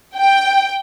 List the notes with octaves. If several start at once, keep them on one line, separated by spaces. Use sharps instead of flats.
G5